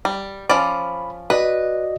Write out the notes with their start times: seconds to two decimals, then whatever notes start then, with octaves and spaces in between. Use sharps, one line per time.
0.05 G3
0.49 F3 C#4 D5 B5
1.30 F#4 B4 D5 D#5